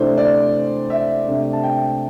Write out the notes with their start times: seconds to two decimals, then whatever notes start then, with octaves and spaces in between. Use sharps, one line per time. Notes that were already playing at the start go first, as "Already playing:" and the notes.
Already playing: C3 E3 A3 D4 C5
0.18 D5
0.90 E5
1.28 C3 A3 D4
1.53 A5
1.64 G5